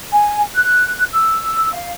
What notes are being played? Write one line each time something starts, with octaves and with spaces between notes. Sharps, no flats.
G#5
F#6
E6
F5